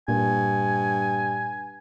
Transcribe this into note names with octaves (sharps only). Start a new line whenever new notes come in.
G2 A#2 G#5